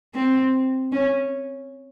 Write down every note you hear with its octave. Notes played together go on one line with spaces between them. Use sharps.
C4
C#4